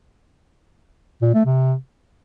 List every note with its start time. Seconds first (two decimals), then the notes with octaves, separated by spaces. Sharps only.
1.22 A#2
1.34 A3
1.46 C3